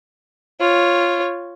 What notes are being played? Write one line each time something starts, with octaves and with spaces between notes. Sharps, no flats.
F4 C#5